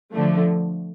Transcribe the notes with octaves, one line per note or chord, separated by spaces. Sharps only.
D3 F3 A3